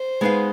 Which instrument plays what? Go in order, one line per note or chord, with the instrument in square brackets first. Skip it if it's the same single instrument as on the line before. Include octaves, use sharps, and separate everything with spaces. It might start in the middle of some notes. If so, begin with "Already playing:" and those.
Already playing: [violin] C5
[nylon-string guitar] G#3 B3 D#4 B4 F5